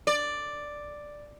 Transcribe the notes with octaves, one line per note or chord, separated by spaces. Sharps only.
D5